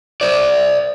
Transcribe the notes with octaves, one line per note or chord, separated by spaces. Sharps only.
C5 D5